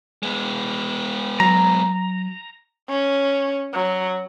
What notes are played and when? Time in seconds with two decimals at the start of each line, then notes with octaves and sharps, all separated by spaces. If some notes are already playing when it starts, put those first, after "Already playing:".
0.23 G#3 B3
1.40 F#3 A#5
2.89 C#4
3.74 F#3